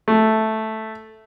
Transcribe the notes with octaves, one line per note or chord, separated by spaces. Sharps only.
A3